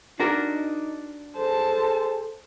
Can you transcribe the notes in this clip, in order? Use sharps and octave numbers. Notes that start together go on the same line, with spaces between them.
D4 D#4 F#4 A#4
G#4 A4 C5 A5